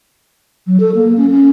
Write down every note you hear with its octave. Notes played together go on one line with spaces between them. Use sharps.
F#3
A4
A#3
C#4
C#4